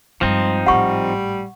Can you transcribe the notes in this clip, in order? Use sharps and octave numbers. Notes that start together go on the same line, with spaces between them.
G2 F3 G#3 C4 D#4
G#1 A2 G3 F#5 C#6